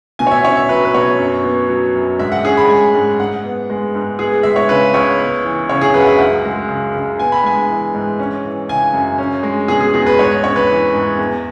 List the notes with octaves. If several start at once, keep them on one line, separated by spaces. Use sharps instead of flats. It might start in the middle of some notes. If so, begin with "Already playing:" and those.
B2 G#5
C#5
E5
C#4 C#5
E5
F#3 B4
B4
B2 C#5
F#2
B3
F#3
F#2
G#2 E5
F#5
C#4 G#4
B5
G#3 G#5
G#2
G#2 F#5
B3
G#3
G#2
B3 G#4
G#3 E5
C#5
C#3 B4
C#2 C#5
B3
E3
C#3 C#5
G#4
F#2 B4
F#5
E5
C#2 F#5
G#3
C#3
C#2
B3 G#5
B5
G#3 G#5
E3
G#2
C#4
E3
C#3 G#5
F#2
C#4
G#3
B2 G#4
G#4
E2 G#4
B4
G#2 C#5
C#4 C#5
B4
E3
G#2
E2